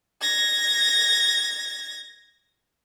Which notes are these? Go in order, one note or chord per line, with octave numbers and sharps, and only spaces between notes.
G#6 A#6